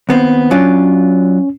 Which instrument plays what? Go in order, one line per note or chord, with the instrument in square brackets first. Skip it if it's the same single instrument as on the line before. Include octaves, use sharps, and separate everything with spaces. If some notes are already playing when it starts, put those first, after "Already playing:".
[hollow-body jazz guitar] D#2 B3 C4
[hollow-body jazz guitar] F#3 D4 F4 [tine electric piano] C#4